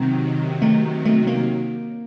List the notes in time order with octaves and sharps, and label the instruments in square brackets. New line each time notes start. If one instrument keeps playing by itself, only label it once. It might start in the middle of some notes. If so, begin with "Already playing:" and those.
Already playing: [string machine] C3 D#3 F#3 [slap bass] C4
[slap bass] A3
A3
A#3